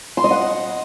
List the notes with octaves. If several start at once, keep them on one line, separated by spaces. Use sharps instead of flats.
C6
D#5
F#5